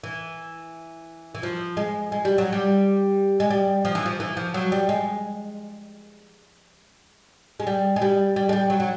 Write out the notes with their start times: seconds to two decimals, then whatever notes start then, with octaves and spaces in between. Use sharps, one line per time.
0.04 E3
1.35 E3
1.43 F3
1.77 G#3
2.12 G#3
2.25 G3
2.38 F#3
2.52 G3
3.40 G#3
3.50 G3
3.85 F3
3.95 E3
4.06 F3
4.20 E3
4.37 F3
4.54 F#3
4.72 G3
4.89 G#3
7.60 G#3
7.67 G3
7.96 G#3
8.02 G3
8.36 G3
8.49 G#3
8.53 G3
8.70 F#3
8.80 F#3